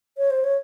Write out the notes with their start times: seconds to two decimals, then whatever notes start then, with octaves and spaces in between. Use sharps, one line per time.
0.17 C#5
0.30 C5
0.44 C#5